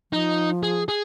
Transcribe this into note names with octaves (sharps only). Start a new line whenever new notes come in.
F3 D#4
G#4
G#4